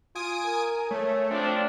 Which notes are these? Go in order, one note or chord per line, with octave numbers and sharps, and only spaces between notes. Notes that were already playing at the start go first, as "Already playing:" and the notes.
F4 G#5 D#6 D7
A#4
A3 C#5
F3 C4 D4